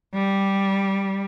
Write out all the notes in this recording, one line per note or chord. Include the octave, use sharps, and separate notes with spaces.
G3